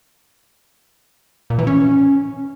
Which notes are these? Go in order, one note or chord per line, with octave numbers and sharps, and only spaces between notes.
A#2
E3
C#4